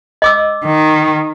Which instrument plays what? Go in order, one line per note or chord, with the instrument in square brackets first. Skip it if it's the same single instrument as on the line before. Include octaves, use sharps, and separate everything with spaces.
[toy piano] D#5 D6 E6
[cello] D#3